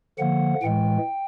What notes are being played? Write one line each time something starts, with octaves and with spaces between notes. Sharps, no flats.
D3 F3 A#3 F#5
A2 E3 G#3 G5